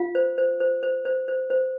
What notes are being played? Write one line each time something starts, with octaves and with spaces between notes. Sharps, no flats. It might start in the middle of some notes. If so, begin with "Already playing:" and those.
Already playing: F4 F5
C5
C5
C5
C5
C5
C5
C5